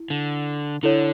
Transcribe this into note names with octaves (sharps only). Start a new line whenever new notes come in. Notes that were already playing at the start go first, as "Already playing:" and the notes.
Already playing: E4
D3
D3 E4 A4 C#5